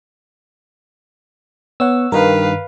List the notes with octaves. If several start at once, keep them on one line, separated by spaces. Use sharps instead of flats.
B3 C#5 F#5 E6
G2 D#3 A#4 B4 F5